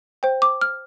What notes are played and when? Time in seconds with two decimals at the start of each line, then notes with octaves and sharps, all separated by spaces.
0.23 C5 G5
0.42 D6
0.61 F6